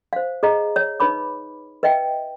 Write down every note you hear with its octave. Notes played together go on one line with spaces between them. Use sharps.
C5 F5
G#4 D#5 A#5
C#5
D#4 B4 C#5 B5 D6
B4 D#5 E5 G5